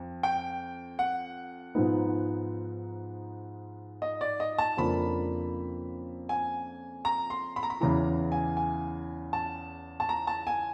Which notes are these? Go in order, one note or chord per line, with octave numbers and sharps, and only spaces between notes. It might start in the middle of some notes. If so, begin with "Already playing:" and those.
Already playing: F2
G5
F#5
G#2 F3 G#3 B3 D#4
D#5
D5
D#5
A5
F2 C#3 F3 A#3 D4 B5
G#5
A#5
C6
B5
A#5
B5
E2 C#3 E3 A#5
G#5
G#5
A5
A5
A#5
A5
G#5